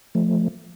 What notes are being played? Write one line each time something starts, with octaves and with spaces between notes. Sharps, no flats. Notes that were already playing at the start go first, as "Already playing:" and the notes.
F3 A3